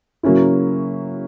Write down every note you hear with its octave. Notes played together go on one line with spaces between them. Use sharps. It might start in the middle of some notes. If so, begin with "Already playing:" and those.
C#3 F#3 A#3 C#4 E4